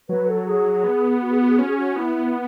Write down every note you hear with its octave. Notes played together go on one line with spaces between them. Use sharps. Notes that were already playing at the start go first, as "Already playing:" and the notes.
F#3 B4
A4
G#4
B3
F#4
G#4
F#4
G#4
C#4 F#4
G#4
F#4
B3 E4